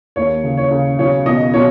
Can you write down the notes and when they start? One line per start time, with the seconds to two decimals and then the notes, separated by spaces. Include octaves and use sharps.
0.16 D#2 C#5
0.43 C#3
0.57 C#5
0.71 C#3
0.98 B1 C#5
1.26 B2 D#5
1.54 B2 C#5